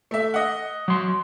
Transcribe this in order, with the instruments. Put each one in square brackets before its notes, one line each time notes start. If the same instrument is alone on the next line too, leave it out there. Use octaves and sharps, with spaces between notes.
[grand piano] A3 E5
D#5 F#5
[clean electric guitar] F#3 C6